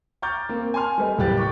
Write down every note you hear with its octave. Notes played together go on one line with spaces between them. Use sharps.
A#5 C#6 D6 F6 G6 A6
A#3 C4
G#5 A5 C6 F6
G3 A3 B4 D#5
F#1 A2 G3 G4 F#6 A6
G5 C#6 D6